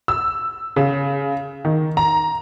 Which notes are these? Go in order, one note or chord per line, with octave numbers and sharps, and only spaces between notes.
E6
C#3
D#3
A#5